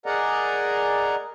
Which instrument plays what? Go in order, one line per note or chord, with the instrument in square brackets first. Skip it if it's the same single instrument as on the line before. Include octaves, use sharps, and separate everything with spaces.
[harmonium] G#4 A#4 D5 D#5 F#5 A#5